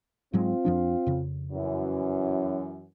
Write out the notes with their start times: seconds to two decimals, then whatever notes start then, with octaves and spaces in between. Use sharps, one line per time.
0.33 G#2 F#3 G#3 C4 F4
0.65 F2 F3 D4
1.06 F2 C#3
1.52 F#2 E3